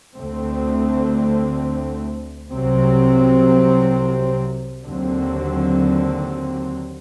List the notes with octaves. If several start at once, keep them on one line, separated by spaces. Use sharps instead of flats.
D2 D3 A3 C4
C2 C3 F#3 C4
D#2 D3 F#3 C4